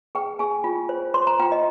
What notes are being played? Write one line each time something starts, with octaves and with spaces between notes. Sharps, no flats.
G#4 G5
G#4 G#5
F4
C5
C5 C6
A#5
F4 G5
D#5